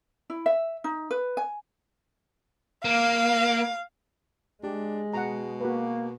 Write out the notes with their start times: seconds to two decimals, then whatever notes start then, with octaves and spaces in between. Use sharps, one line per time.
0.30 E4
0.46 E5
0.84 D#4
1.11 B4
1.37 G#5
2.85 A#3 F5
4.64 G#3 D4 G4
5.13 B2 F#5 A#5
5.60 A#3 F#4 B4